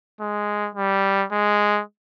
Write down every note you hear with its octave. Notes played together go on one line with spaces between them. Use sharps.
G#3
G3
G#3